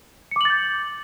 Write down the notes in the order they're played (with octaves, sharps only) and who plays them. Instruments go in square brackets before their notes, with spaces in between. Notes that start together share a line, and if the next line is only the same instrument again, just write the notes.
[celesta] C#7
D6
F#7
A6
G6